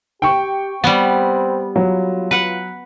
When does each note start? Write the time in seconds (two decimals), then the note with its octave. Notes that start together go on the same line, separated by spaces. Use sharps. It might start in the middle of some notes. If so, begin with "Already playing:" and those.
0.22 G4 G5 C#6
0.84 G3 B3 C4
1.76 F#3 F4
2.31 B4 F#5